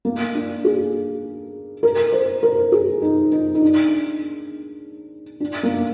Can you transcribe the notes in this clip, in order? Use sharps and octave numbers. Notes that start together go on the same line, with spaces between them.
A#3
D4
G#4
A#4
C5
A#4
G#4
D#4
D#4
D#4
D4
D4
A#3